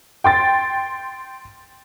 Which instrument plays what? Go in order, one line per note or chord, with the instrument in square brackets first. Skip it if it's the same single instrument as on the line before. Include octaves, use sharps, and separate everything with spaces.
[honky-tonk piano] G5 C6 A6